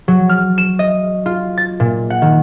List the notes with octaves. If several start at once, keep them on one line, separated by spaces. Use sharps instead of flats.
F#3
F6
E7
D#5
F4
A6
A#2
F#5
D#3